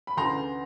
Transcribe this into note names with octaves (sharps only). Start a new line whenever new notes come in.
B5
D2 C#3 E3 A#5 C6